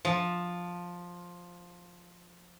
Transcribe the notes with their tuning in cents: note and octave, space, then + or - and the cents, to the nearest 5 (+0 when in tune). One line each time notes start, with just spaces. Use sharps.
F3 +10